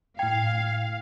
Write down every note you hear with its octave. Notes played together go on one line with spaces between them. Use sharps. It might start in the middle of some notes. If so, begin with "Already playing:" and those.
A2 F5 G5 G#6